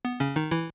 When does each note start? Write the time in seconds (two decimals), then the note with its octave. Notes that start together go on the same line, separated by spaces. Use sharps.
0.05 B3
0.20 C#3 C#4
0.36 D#3 D#4
0.51 E3 E4